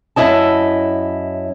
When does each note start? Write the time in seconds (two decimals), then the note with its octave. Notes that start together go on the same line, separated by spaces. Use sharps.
0.16 F#2 E4 D#5 A5